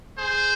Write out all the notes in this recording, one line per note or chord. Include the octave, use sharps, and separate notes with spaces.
G#4 C5